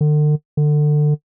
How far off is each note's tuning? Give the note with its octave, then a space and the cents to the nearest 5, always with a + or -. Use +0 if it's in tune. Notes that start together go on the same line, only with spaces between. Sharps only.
D3 +40
D3 +25